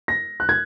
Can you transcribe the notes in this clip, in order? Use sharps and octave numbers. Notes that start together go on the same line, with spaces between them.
A#6
F#6
G#6